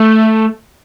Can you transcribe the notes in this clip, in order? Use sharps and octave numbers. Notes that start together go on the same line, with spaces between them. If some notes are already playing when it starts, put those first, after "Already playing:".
Already playing: A3